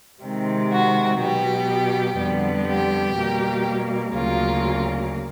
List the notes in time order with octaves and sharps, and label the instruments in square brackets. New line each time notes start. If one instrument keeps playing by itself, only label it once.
[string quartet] C3 D#3 G#3 C4
F#4
B2 F#3 B3 G4
F2 D3 G3 B3
G4
B2 G3 A#3
D2 C#3 F#3 A#3 F4